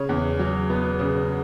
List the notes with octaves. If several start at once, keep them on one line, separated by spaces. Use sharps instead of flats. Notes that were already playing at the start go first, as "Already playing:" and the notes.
Already playing: C#3 C#5
E2
F#3
B3
C#3